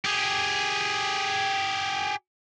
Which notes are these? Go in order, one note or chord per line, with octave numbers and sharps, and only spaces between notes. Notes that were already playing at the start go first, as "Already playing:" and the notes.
G4 G#4